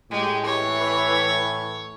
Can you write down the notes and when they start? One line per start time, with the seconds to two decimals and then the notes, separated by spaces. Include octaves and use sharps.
0.11 A2 G#3 G4
0.46 E3 C#5